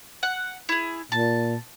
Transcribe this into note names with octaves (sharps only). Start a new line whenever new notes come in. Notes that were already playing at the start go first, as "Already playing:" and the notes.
F#5
E4 G#4
A#2 A5